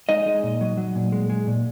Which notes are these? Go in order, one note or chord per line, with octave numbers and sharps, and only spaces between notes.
G#3 D#4 D#5
G#3
A#2
F#3
F#3
A#2
G#3
G#3
A#2